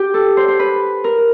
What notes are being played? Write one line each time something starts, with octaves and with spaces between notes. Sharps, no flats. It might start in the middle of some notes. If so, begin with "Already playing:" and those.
Already playing: G4
A4
C5
C5
B4
A#4